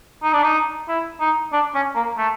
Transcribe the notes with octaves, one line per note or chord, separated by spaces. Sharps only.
D#4
D4
D#4
E4
D#4
D4
C#4
A#3
A3